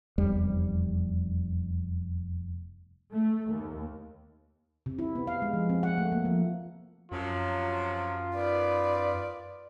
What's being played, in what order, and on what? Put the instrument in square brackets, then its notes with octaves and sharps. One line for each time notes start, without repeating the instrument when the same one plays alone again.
[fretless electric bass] F1 E2 G3
[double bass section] A3
D#2
[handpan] C3
E4
B3
F5
G#3
F3
C4
F#5
A3
A#3
F3
[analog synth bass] F#2 [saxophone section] C3 F3 F#3 [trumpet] F4
[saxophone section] D#3 B3 B4 [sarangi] D5